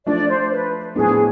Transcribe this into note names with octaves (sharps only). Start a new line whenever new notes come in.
F3 A3 D4 D5
C5
B4
A2 F3 B3 D4 G#4